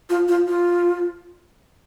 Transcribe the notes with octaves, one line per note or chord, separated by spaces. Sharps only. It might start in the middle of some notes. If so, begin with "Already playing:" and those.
F4
F4
F4